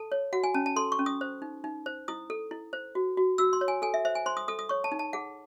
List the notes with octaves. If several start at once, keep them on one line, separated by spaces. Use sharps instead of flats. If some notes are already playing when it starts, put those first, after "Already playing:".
Already playing: A4 A5
C#5
F#4 F#5
G#5
C#4 A5
A5
A4 C6
C#6
C#4
D#6
C5
D#4
D#4
C5
E4 D#6
A4
E4
C5
F#4
F#4
F#4 E6
C6
C#5
G#5
A4 G#5
E5
C5 E5
G#5
C5 C6
D#6
A4 D#6
D#6
C#5 C#6
A5
D#4
A5
G#4 F#5